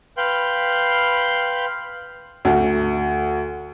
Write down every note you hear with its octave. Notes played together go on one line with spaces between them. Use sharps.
B4 F5 G5 B5 C6
D2